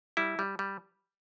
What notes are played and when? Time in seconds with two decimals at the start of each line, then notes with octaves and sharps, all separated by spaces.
0.17 G3 E4
0.39 G3
0.59 G3